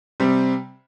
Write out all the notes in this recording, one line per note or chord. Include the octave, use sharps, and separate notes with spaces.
C3 G3 C4